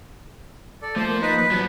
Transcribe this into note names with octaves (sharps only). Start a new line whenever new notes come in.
A4 D5
F3 A3 C5
A#3
D#4 B4
B4
F3 F#3 B3